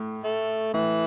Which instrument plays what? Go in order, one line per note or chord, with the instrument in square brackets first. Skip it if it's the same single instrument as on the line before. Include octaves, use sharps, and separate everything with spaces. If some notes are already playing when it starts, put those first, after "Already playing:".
Already playing: [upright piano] A2
[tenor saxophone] A3
[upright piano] A2 [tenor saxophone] E3